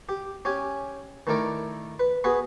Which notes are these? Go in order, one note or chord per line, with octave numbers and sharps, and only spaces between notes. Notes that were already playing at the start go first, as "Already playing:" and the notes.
G4
C#4 G4 G#5
D#3 A3 E4 A#4 D5
B4
B3 F#4 G#4 B4